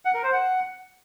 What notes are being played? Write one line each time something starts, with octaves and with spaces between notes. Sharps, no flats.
F#5
A#4
C5
F#5